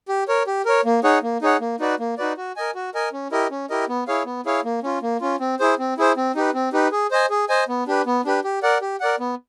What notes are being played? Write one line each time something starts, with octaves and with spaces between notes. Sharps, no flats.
G4
A#4 C#5
G4
A#4 C#5
A#3
D#4 G#4 C#5 F#5
A#3
D#4 G#4 C#5 F#5
A#3
D#4 F#4 B4 D5
A#3
D#4 F#4 B4 D5
F#4
A#4 D#5 G#5
F#4
A#4 D#5 G#5
C#4
E4 G4 A#4 D#5
C#4
E4 G4 A#4 D#5
B3
E4 G#4 C#5 F5
B3
E4 G#4 C#5 F5
A#3
C#4 F4
A#3
C#4 F4
C4
E4 G#4 C5
C4
E4 G#4 C5
C4
D#4 G4 B4
C4
D#4 G4 B4
G#4
C5 D#5 G#5
G#4
C5 D#5 G#5
B3
D4 G4 B4
B3
D4 G4 B4
G4
A#4 D5 F#5
G4
A#4 D5 F#5
B3